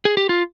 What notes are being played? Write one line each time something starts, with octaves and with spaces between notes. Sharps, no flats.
G#4
G4
F4